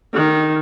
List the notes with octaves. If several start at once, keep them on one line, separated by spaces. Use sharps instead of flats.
D#3